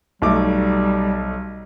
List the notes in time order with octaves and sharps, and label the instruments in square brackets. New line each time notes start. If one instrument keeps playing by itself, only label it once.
[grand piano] B1 A3 D6 [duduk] G3